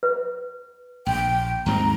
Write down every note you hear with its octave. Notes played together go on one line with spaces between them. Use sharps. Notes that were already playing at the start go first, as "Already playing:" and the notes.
B4
A#1 G5
D#2 G#2 C4 A#5